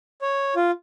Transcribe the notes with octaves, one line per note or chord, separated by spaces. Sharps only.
C#5
F4